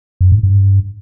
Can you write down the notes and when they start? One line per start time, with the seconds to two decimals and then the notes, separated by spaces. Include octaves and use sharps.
0.21 F#2
0.32 G#2
0.43 G2